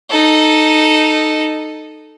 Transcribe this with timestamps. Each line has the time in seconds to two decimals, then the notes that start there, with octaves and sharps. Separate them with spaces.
0.10 D#4 A4